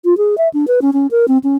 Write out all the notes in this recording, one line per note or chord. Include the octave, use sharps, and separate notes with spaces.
F4
G#4
E5
D4
B4
C#4
C#4
A#4
C4
C#4